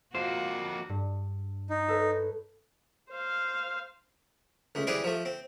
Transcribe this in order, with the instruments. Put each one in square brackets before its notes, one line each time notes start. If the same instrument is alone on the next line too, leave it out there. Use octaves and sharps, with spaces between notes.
[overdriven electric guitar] F2 A#3 [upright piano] F4 F5 [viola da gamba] F#4 [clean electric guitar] C5
[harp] G2
[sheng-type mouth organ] D#4
[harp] A4 B4 C#5
[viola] C5 F5
[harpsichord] C#2 A3
E3 G3 C4 G#4 D5
F3 A3
C4